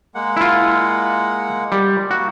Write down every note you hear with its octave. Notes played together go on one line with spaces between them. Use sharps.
G#3 A#3 F#5
E4 F4
G3
A#3 D#4 F#4